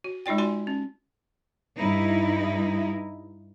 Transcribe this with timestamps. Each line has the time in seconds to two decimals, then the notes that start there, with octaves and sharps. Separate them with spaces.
0.04 F#4
0.26 G#3 D#4 F4 D5 G5
0.38 F#4 D5 G#5 C6
0.67 C#4
1.78 G2 D#4 E4